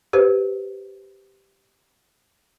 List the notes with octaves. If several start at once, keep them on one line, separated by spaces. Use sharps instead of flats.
G4 B4 C5